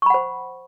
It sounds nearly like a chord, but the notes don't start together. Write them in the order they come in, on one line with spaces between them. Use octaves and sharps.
C#6 B5 F#5 C5